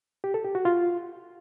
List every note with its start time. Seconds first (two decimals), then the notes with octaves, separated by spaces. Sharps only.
0.24 G4
0.34 A4
0.45 G4
0.55 F#4
0.65 F4